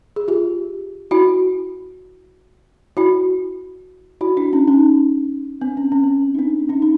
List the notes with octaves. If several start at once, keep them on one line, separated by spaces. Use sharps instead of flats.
G#4
F4 G4
E4 F#4
E4 F#4
E4 F#4
D4 E4
C#4 D#4
C#4 D#4
C4 D4
C#4
C#4
C4
C#4
D#4
C4 D4
C#4 D#4
D#4